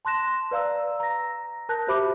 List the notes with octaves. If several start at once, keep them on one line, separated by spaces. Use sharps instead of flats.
A5 C6 F#6 A#6 E7
B4 D5 F5 A#5 E6
A#5 A#6
A#4 A5 F#6 G6 A#6
F#4 G4 C5 E5 B5 D6